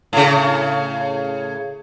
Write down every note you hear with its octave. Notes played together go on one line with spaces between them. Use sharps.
A2 C#3